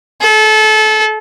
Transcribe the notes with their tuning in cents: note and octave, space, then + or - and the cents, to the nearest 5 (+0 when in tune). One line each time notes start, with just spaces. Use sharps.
A4 -30